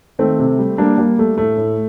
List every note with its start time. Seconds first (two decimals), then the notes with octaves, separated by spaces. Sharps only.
0.19 D#3 A3 C4
0.39 C3
0.58 G3
0.78 G3 A#3 D4
0.98 G3 A#3
1.19 G3 A3
1.38 A2 A3
1.58 A2